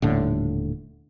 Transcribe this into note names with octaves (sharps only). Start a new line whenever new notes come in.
D#1 A2 D3